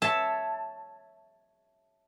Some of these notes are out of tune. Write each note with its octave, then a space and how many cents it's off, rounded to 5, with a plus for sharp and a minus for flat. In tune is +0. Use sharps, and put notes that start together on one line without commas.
C#5 +0 E5 +0 A5 +0